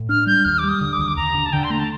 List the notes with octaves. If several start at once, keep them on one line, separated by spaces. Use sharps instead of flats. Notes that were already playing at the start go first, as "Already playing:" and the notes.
Already playing: A2
D4 F6
G3 G6
D#2 F6
D6
G3
D#6
D3
D6
D#2 D#6
D6
D#2 A#5
D3
A5
D3 G5
C6
A3 A#5
A5